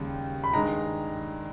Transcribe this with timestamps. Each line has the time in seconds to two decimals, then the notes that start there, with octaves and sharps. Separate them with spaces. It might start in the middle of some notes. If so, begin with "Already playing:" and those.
Already playing: D#2 C#3 G3
0.44 B5
0.53 G2 D#3 G#3 A#5